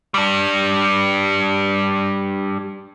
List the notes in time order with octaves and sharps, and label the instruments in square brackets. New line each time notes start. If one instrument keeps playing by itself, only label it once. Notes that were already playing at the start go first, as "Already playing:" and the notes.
[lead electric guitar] G3 D4